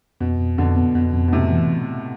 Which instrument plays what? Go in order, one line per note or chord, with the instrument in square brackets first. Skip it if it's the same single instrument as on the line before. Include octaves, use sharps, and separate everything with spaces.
[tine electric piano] F2 [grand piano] B2
[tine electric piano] F2
[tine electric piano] F2 [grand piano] B2 D3
[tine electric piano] B3
[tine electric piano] F2 [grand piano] B2
[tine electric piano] F2
[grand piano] B2
[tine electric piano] F2 [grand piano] A2 C3
[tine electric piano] E3